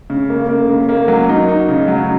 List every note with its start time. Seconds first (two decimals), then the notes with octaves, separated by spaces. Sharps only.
0.10 C#3
0.30 A#3
0.49 A#3
0.69 C#3
0.89 A#3
1.08 F#3
1.29 D#4
1.48 D#4
1.69 C#3
1.88 F#3